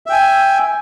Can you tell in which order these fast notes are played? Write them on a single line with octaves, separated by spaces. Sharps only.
E5 G5 G#5